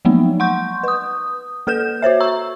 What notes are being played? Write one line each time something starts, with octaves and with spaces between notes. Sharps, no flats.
F3 F#3 G#3 A#3 B3 D#4
F#5 C6 C#6 G6
B4 D#6
A#3 A4 B4 G6 E7
F#4 C5 C#5 E5
A#5 C#6 E6